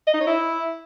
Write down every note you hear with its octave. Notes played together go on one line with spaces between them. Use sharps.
D#5
D#4
C#5
E4